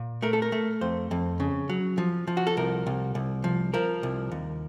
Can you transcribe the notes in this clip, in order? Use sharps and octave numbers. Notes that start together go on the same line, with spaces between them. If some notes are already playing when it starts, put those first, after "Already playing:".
Already playing: A#2
A3 A#4
A4
A#4
A3
F2 C5
F2
C#3
F#3
F3
F3
F#4
A4
C2 A#4
C2
C2
F3
F3 A#4
C2
D#2